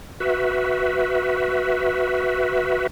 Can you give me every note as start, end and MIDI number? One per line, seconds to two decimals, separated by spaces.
0.20 2.87 66
0.20 2.87 71
0.20 2.87 76